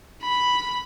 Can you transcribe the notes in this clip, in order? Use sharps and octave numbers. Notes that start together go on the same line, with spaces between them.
B5